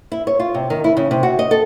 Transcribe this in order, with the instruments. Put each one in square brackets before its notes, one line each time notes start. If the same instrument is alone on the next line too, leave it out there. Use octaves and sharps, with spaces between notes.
[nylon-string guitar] E4
C#5
F4
C3
D#3
E4
C#3
C3
F#4
D#5
A4